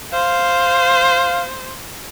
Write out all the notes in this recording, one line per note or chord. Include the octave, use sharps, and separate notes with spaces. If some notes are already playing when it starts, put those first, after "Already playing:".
C5 F5